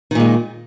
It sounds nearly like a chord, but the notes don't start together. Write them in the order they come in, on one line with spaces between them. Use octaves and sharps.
D#3 A#2 G#3